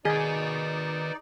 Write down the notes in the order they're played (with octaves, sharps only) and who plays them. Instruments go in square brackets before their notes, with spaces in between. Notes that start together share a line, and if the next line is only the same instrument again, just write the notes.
[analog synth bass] D#3 [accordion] D#4 D5 [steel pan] G#4 [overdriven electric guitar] B4 D#5